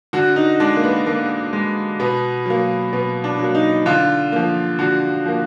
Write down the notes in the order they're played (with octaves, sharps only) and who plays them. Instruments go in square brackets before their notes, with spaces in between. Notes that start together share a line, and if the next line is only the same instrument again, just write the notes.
[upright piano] D3 F#4
D#4
G#3 D4
A#3
B3
D3 A#3
G#3
B2 B3
F#3 A#3
B2 B3
D4
F#3 A#3
D#4
D3 F4
F3 A#3
D3 F#4
F3 A#3